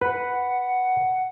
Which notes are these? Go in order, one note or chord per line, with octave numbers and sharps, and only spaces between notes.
B4 F#5